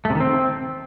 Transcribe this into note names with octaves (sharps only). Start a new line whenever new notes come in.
A3
C3
D#3
C4